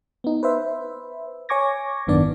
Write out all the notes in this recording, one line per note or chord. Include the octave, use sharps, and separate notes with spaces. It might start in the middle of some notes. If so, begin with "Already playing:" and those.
B3 D#4
B4 C5 E5
C#5 G#5 C#6 D6 G#6 A#6
G#1 F#2 D#3 B3 D4 D5